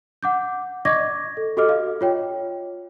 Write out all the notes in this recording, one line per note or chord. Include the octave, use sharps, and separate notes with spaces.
F#5 D6 G6
D5 D#5 C#6 D6 G#6 A#6
A4
F#4 G4 A4 D#5 D6 F6
D#5 F5
F4 C#5 G5